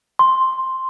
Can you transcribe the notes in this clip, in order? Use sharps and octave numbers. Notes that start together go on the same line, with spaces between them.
C6